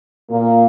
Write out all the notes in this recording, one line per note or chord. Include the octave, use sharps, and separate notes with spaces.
A#2 A#3